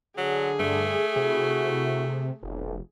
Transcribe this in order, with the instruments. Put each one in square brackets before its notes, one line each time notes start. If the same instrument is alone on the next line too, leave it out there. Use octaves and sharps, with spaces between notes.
[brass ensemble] D3 [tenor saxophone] F#3 [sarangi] G#4
[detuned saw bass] G2 [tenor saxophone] A3
[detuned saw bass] C3 [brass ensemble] E4 F#4
[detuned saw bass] F1 [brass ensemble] B1